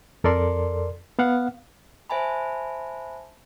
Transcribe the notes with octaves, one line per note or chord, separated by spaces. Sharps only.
F2 A4 A#4 D5 C6
B3 F5 F#5
C5 E5 G#5 A5 B5